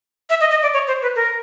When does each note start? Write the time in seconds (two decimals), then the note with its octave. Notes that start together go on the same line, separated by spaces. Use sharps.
0.30 E5
0.41 D#5
0.51 D#5
0.62 D5
0.74 C#5
0.88 C5
1.02 B4
1.16 A#4